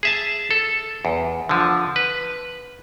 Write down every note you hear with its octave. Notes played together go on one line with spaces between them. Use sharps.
G#4 E5 A5
A4
E2
D3 F3
B4